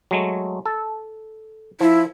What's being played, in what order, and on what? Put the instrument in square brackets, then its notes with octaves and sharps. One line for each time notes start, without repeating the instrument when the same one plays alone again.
[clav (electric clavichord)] F#3 G#3 A3
A4
[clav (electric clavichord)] F3 [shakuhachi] E4